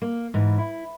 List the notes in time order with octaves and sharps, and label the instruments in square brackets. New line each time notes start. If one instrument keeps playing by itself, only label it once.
[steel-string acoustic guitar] A#3
G#2 E3
E4